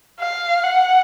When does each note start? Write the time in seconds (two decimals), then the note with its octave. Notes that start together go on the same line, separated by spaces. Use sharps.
0.19 F5
0.64 F#5